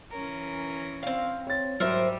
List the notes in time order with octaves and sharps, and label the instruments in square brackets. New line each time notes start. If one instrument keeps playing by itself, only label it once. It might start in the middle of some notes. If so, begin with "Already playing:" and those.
[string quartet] E3 C#4 A#4
[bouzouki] C4 F5
[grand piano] C#5 A6
[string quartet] G#2 G3 [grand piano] F#3 [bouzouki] A#4 C5 E5